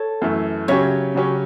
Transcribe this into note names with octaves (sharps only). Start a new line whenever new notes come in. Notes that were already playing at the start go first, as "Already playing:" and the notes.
Already playing: A4 C#5
F#2 E3 A3
C#3 F#3 C#4 G4 C#5 E5
C#3 F#3 C#4 G4